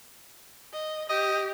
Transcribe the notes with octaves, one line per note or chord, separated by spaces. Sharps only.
D#5
G4 D#5